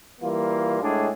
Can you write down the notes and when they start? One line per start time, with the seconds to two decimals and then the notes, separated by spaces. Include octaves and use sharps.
0.21 E3 G3 A#3 F4
0.82 A2 G#3 D4 G#4